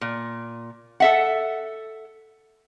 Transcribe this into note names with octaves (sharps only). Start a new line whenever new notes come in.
A#2
A4 E5 F#5